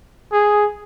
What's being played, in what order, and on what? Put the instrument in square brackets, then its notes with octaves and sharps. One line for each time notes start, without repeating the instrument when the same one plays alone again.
[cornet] G#4